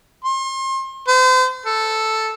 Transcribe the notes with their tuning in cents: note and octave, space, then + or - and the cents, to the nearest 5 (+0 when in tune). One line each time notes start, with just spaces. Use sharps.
C6 +35
C5 -35
A4 +0